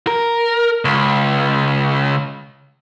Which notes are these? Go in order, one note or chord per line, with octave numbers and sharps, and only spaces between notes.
A#4
C#2